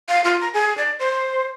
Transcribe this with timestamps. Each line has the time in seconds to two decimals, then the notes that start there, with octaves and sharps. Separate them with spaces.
0.09 F5
0.24 F4
0.41 A#5
0.54 G#4
0.77 D5
0.99 C5